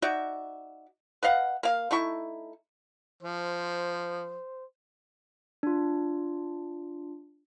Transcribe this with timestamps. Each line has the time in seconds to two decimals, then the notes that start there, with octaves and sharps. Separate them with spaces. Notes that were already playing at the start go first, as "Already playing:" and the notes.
0.02 D#4 F#4 D5 E5
1.23 B4 D#5 F5 F#5
1.63 A#3 F5
1.91 A3 D#4 E4 C#6
3.23 F3 C5
5.63 D4 F4